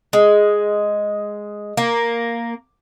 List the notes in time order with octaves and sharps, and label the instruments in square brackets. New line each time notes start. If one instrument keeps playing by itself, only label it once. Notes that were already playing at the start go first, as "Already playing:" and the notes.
[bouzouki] G#3
A#3